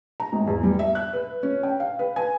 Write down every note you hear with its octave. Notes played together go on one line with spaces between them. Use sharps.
A#5
G#1
E2
G3
E5
F#6
B4
C#4
G5
F5
B4
G#5